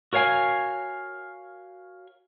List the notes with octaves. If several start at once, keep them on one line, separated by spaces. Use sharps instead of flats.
F#4 A#4 C#5 F5 G#5